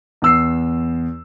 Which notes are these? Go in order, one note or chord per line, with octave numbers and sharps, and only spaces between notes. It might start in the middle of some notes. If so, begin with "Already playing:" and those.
E2 E6 C7